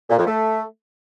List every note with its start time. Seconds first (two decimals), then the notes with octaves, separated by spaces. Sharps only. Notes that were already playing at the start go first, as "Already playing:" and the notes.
0.10 A#2
0.18 F2
0.27 A3